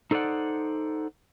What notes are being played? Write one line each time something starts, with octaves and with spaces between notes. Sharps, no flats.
D#4 A4 C5 D5 F#5